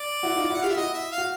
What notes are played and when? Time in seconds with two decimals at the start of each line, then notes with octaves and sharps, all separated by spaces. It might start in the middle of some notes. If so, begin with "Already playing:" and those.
Already playing: D5
0.23 E4 F#4
0.36 D#4 F4
0.50 E4 F#4 F#5
0.62 F4 G4 F5
0.69 E5
0.76 E4 F#4 D#5
0.94 E5
1.12 F5
1.18 F#4